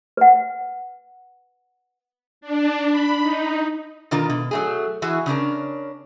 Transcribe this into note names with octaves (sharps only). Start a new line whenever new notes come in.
B4 F#5
D4
B5
D#4
B2 D#3 D4 F4 A#4
B2
F#3 A3 G#4
E3 E4 F#4 G#4
C#3 C#4 D4 A#4